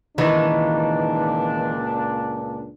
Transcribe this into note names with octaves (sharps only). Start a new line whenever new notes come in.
C#2 A#2 D#3 E3 D4 D#4